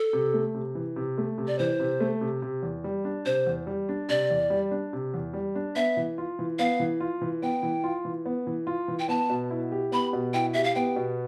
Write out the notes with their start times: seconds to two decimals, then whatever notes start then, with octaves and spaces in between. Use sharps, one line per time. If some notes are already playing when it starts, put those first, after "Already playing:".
Already playing: A4
0.13 C3
0.34 A3
0.54 C3
0.75 E3
0.96 C3
1.18 A3
1.38 C3
1.48 D5
1.59 E3 C5
1.80 C3
2.00 A3
2.21 C3
2.42 C3
2.63 E2
2.84 G3
3.05 D4
3.25 C3 C5
3.47 E2
3.67 G3
3.89 D4
4.09 C3 D5
4.30 E2
4.50 G3
4.71 D4
4.93 C3
5.14 E2
5.33 G3
5.55 D4
5.76 B3 E5
5.97 E3
6.18 F4
6.39 E3
6.59 B3 F5
6.80 E3
7.00 F4
7.21 E3
7.42 B3 G5
7.63 E3
7.84 F4
8.05 E3
8.25 B3
8.47 E3
8.67 F4
8.88 E3
8.99 G5
9.08 B3 A5
9.29 B2
9.50 E4
9.72 G4
9.92 B3 B5
10.13 B2
10.34 E4 G5
10.54 G4 E5
10.64 F5
10.75 B3 G5
10.96 B2